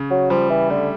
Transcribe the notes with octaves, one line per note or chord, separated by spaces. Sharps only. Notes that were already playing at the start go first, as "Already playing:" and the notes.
Already playing: C#3
F#3
F3 G3
E3
D3 A3